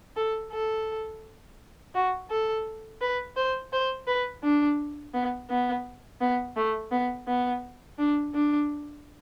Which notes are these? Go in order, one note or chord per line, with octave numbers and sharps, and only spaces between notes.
A4
A4
F#4
A4
B4
C5
C5
B4
D4
B3
B3
B3
A3
B3
B3
D4
D4